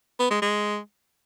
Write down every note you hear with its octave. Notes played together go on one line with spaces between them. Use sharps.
B3
G#3
G#3